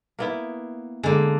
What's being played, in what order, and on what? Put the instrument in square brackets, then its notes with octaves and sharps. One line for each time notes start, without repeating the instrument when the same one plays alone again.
[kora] A#3 B3 E4
[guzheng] D3 A#3 [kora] G#3